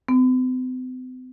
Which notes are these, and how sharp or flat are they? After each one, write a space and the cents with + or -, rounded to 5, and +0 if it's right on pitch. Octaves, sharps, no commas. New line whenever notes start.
C4 -45